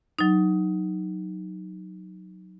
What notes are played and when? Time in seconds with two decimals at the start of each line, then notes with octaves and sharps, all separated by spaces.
0.19 F#3 D#4